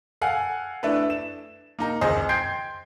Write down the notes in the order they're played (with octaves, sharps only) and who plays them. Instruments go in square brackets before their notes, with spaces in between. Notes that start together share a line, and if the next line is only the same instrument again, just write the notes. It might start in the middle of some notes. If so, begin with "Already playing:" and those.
[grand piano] A4 F5 F#5 G#5
A3 D4 E4 B4
E7
A#3 D#4 A#5
G#1 C#2 G#4 C5 D#5
G5 C6 G6 G#6 C7 D7